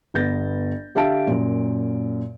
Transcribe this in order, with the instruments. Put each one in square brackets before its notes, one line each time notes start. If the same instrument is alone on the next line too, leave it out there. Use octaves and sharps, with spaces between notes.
[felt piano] G1 B3 G6 A6 A#6
D3 G4 E5 F5 A5 D7
F#2 A#2